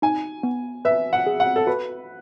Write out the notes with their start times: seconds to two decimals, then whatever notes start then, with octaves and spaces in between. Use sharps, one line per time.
0.02 D#4 G#5
0.43 B3
0.85 B4 E5
1.13 F#5
1.27 G#4
1.40 F#5
1.56 A4
1.67 F#4 B4